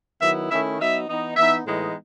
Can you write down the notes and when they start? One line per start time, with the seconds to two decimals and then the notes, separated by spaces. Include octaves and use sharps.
0.22 D#3 F#3 B3 E4 E5
0.50 D#3 A3 C#4 E4 E5
0.80 F#3 B3 D#4 E5
1.09 E3 B3 D#4
1.37 E3 B3 D#4 E5
1.66 A2 E3 G#3 B3 D#4